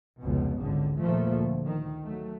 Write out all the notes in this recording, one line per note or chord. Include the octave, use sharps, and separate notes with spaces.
F1 C#2 B2
G#1 C#2 D3
D#2 A#2 F3 A3 A#3
D2
D#3
F#3 A3